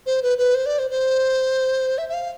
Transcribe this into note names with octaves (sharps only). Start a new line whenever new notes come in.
C5
B4
B4
C5
D5
C5
C5
E5
E5
F5